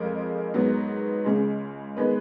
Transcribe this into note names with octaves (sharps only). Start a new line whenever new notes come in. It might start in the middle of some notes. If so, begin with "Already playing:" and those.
Already playing: F2 F3 G#3 A#4
G#2 F#3 B3
C#2 C#3 G#3
D#3 G#3 B3 B4